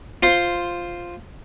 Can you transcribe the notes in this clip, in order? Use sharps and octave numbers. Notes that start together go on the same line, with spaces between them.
F4 C5 C6